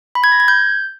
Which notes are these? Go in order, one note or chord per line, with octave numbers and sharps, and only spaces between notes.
B5
G#6
A#6
G#6
G6